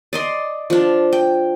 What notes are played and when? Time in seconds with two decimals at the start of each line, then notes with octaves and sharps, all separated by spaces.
0.13 D5 D#5 C6
0.70 F3 D4
1.13 G5